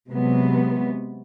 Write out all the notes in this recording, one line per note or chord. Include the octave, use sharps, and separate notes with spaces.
C3 F#3 G#3 B3